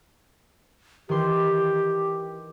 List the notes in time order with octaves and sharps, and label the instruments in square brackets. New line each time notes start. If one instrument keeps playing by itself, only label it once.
[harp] D#3 E3 C6 [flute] G4